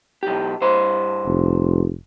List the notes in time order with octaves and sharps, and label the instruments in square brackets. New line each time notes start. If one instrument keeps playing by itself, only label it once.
[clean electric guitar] B1 G4
G2 C5
[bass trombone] F1